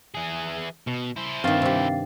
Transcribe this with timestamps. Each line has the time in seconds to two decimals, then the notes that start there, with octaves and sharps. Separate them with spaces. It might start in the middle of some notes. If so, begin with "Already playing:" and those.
0.14 E3 G#4
0.87 B2
1.16 E4 C5
1.44 G2 D#3 C4 F5 A6
1.62 C3 G4